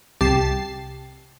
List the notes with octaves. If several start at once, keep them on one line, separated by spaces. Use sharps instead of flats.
C2 C3 G4 A5 A6 C7